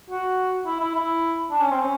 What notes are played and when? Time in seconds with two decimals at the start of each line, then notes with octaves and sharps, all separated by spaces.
0.10 F#4
0.66 E4
0.80 E4
0.95 E4
1.51 D4
1.61 C#4
1.71 C4
1.80 C#4